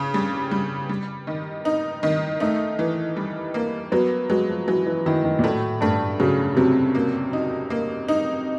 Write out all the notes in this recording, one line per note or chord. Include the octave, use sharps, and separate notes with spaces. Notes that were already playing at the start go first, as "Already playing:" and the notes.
Already playing: C#3
G3
G3
G3
D#3
D#4
D#3
A3 D#4
E3
G3
A#3
F#3 B3
F#3 G#3
F3
E3 F#3
E3
D#3 E4
D#3
A#2
A2 A3
G2 A3
C#3 F#3
C3 F#3
A#3
D#4
A#3
D#4